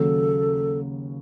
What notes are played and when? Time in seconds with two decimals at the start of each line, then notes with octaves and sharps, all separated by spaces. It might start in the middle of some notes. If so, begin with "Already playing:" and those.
Already playing: D#2 C#3 F#3 A4